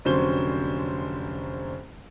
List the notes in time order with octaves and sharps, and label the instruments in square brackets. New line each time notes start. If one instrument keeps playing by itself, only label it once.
[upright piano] F1 D3 F#3 C#4 C5 G7